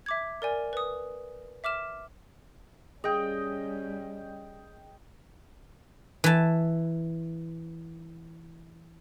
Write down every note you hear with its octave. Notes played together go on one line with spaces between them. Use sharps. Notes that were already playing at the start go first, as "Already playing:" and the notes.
E5 D6 G#6
A#4 D5 G#5
B4 D#6
E5 D6 F6 E7
G3 C#4 G#4 D#5 G5
E3 A5